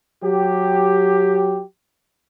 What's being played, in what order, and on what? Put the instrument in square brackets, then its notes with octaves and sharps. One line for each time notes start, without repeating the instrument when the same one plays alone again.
[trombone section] F#3 G4